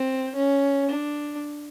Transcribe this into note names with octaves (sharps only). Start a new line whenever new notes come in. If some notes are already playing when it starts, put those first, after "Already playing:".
Already playing: C4
C#4
D4